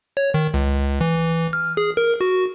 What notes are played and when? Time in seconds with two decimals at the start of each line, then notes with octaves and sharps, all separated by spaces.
0.17 C#5
0.34 D#3
0.54 C#2
1.01 E3
1.53 F6
1.77 G#4
1.97 A#4
2.21 F#4